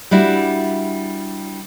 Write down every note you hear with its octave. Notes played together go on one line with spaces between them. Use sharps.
G3 D4 E4 F#4